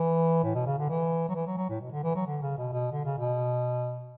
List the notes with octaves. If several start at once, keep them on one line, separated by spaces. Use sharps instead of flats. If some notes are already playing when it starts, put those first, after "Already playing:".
Already playing: E3
A2
B2
C#3
D3
E3
F#3
E3
F#3
F#3
A2
B2
D3
E3
F#3
D3
C#3
B2
B2
D3
C#3
B2